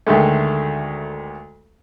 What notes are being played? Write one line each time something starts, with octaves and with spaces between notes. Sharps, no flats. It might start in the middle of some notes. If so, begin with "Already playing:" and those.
D2 D#3 G#3 A3